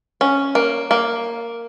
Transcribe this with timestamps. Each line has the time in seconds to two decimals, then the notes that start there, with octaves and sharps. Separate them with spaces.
0.21 C#4
0.55 A#3
0.91 A#3